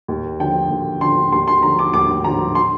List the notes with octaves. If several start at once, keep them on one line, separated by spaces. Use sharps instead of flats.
D#2
D3 F3 G5
D#2
D3 F3 C6
D#2 C6
C6
D3 F3 A#5
D6
D#2 D6
D3 F3 A#5
C6